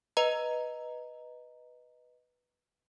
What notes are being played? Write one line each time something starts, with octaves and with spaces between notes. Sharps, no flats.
B4 D#5 A#5